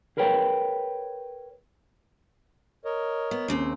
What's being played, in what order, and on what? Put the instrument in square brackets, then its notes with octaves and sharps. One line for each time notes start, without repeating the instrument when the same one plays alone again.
[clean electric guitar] G#4 A#4 B4 C#5 G5
[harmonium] A#4 C#5 D#5
[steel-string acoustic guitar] B3
D#2 C#3 C4